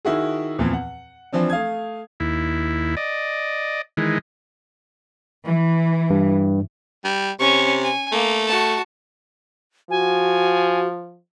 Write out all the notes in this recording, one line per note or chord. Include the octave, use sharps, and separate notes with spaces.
D#3 E4 F#4 G#4
E2 A#2 E3 F3 C4
F#5
E3 F3 C4 D4
A3 F5 D#6 G#6
D#2 E4
D5 D#5
D#3 E3 G#3
E3
G2
G3
C3 C#4 C#6
G#5
A3 A#3
F#4 A5
F3 F#4 G#5